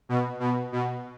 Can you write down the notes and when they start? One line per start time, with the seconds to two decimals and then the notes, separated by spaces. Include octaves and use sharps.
0.09 B2
0.40 B2
0.72 B2